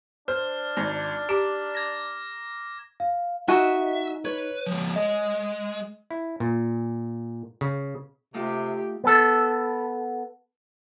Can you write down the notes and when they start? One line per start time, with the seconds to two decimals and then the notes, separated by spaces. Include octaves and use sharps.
0.28 D4 C5 F6
0.77 G#1 D#4
1.29 G4 A#5 D6
1.75 G#6 A#6
3.00 F5
3.48 D#4 F#4 D#5 E5 G#5
4.25 B4 C#5
4.66 F3 G#3
4.96 G#3 D#5
6.11 E4
6.40 A#2
7.61 C#3
8.34 C3 A3 D#4 F4 G4
9.04 B3 A4